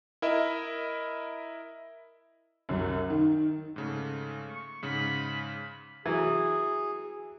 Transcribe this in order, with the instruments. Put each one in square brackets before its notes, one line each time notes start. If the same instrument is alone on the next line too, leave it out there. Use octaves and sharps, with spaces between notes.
[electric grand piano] E4 A#4 D#5 E5
[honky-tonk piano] C2 F#2
D#3
[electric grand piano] G#2 C#3 A3
[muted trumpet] C#6
[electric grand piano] G#2 C#3 [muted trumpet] B5
[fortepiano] E3 F#3 [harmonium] G#4